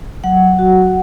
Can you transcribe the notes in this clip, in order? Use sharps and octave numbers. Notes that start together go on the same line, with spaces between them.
F#3 F#5
F#4